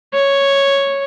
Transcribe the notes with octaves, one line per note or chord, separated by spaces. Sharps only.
C#5